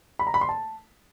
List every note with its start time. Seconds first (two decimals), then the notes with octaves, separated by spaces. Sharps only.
0.19 B5
0.27 A#5
0.34 B5
0.41 C6
0.49 A5